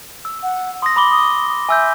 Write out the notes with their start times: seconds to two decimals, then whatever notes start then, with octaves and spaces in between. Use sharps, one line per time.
0.25 E6
0.43 F#5
0.82 C6 D#6 A#6
0.96 B5 D6 G7
1.11 D#6
1.69 E5 G#5 E6 G6